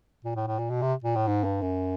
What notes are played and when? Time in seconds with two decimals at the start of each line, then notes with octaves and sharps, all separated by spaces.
0.24 A#2
0.36 A2
0.47 A2
0.58 A#2
0.70 B2
0.82 C3
1.04 A#2
1.16 A2
1.27 G#2
1.44 G2
1.62 F#2